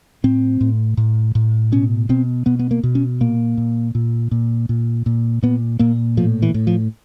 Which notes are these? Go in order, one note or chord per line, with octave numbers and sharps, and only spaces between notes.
A2 C4
A2
A2
A2
B2 C#4
B2 C4
B2 B3
B3
A#3
B2
C#4
A#2 A#3
A#2
A#2
A#2
A#2
A#2
A#2 B3
A#2 A#3
A2 F3
E3
A2
F3